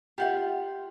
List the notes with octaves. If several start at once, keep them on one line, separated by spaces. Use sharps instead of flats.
F4 G4 E5 F#5